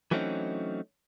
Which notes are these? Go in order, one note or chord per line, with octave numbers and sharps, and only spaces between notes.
E3 F#3 A3 C4 C#4 D#4